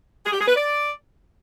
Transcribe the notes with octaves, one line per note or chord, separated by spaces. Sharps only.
G#4
G4
G#4
B4
D5